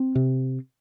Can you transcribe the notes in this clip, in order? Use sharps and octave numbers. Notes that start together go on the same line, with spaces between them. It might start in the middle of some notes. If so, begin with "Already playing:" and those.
Already playing: C4
C3